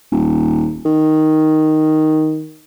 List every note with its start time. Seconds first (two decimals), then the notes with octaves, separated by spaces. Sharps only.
0.12 D#1
0.85 D#3